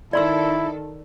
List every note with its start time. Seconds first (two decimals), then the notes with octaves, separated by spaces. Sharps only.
0.13 D#3 E4 A4 D5 C6 E6